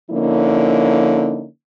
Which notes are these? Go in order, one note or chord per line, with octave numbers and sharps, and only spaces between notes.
D3 F3 A#3 C#4 D#4 E4